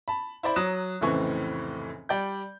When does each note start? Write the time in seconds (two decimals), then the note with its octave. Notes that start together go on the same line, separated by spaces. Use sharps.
0.08 A5 B5
0.43 E4 C5 D5 B5
0.56 F#3 A#5 D#6 F#6 E7
1.01 F1 C#2 A2 E3 C4 C#6
2.09 G3 D5 G5 G6